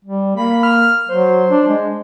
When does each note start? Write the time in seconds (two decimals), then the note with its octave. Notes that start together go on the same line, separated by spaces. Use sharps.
0.05 G3
0.36 A#3 B5
0.63 F6
1.09 F#3 C5
1.49 D4
1.68 G#3